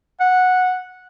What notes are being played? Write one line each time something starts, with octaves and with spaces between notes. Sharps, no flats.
F#5